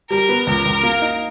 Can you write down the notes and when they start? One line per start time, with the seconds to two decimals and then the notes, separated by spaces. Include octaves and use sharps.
0.10 G3 A#4
0.29 B3
0.47 C#2 A#4
0.66 C#2
0.83 A#3
1.02 D#4